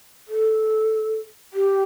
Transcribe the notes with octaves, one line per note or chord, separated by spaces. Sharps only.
A4
G4